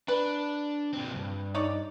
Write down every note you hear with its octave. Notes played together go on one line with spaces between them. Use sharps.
D4 B4
A#2 C4
C2 G2
D#4 C#5 D5